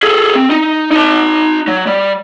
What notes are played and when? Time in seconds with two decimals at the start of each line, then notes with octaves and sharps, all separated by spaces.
0.03 G#4 A4
0.35 C4
0.50 D#4
0.91 D#4 A5
1.68 F#3
1.87 G3